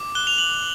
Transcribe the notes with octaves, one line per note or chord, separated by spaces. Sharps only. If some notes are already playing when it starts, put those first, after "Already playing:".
Already playing: D6
F#6 G7
F7
F#7